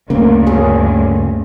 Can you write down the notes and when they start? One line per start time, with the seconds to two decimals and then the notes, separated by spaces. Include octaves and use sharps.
0.10 D2 G2 C#3 A#3
0.47 C#4 G#4